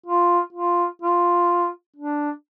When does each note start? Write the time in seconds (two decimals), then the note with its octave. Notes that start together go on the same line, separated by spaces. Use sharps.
0.06 F4
0.53 F4
1.02 F4
1.97 D4